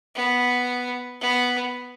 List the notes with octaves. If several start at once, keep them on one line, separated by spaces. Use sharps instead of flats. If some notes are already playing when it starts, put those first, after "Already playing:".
B3
B3